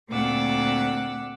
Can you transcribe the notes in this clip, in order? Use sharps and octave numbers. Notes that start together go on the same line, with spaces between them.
D2 A#2 C4 F#5 D6 E6